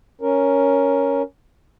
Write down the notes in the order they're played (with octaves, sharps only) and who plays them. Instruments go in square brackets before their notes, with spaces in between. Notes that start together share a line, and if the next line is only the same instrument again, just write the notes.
[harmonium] C#4 A#4